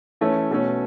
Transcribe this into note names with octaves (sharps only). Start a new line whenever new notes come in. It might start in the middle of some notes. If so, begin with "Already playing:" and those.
E3 A3 C#4
B2 A3 C#4